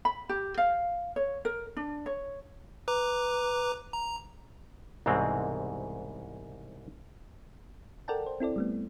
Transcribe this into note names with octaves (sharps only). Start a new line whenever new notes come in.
B5
G4
F5
C#5
A#4
D4
C#5
B4 A#5 D6
A#5
C2 G#2 B2 E3 G#3 C4
A4 A#4 D5 F#5 G5 A5
C5
C4 E4 A4 D5
G3 A3 B3